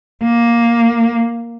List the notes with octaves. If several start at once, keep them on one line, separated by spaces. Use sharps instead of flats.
A#3